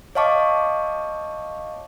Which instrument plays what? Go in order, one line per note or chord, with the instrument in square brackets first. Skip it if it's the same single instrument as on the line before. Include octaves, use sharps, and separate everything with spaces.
[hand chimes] C#5 D#5 F5 A5 C#6 D6